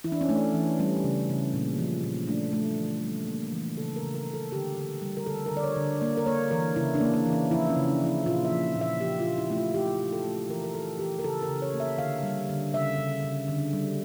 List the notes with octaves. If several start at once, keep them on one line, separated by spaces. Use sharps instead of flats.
E3 E4
D4
C#4
A3 D4
E3
G3 C#4
C#3
C#3
A#2
F3
A#2
A3 D4
A3
E3
G3
A#3
E3
C#3 A4
A#4
C#3
A#4
C#3
A4
D3 G4
D3
G3
A#4
D3 A4
A#4
D3
D5
C#5
D3
A#3 D5
A#4
A#3 C#5
E3 A#4
C#3 E4
D4
A#3
A#3
E3
C#4
F3 E4
C#4
C#3
D4
F3
E4
A#2 F4
E5
F3
A#2
E5
F3 G4
F4
A#2
E4
A3 E4
F4
A3 G4
A#2
A4
A3
E3 A#4
A#4
E3 A4
E3 G4
A#4
C#3 A4
A#4
C#3
C#5
A#3
E5
D3 F5
G3
D3
C#3 E5
C#3
C#3
D3
G3